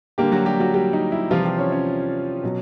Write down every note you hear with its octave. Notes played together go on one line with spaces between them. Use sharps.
D3 G3 A#3 G4
F#3 F#4
G3 G4
F#3 F#4
G3 G4
D#4
E4
C3 E3 F3 G3 F4
G3 G4
C#4 C#5
C#4 C#5
B2 F#3